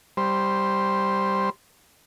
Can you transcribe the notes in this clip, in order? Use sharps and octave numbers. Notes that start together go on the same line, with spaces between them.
G3 C5